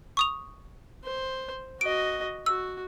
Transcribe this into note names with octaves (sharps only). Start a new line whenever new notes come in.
C#6 D#6 F7
C5
F#4 D#5 D7
F#4 E6